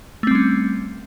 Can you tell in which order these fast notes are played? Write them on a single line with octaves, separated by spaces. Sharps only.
A3 C4 G3 C#4